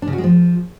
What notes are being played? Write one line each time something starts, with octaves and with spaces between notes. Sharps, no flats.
D4
C#3
F#4
G#3
F3